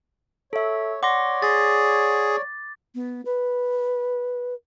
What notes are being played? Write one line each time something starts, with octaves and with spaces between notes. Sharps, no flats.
A4 C#5 E5
C#5 D5 F#5 C6 D6 A#6
G#4 A6
B3
B4